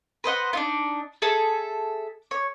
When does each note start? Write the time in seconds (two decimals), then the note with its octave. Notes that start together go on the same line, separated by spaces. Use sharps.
0.24 B4 C5 D#5 F#5
0.53 D4 D#4 F4
1.22 G#4 A4 E5 A5
2.31 C#5